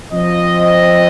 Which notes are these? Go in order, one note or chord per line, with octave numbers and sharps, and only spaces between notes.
F3 C4 D#5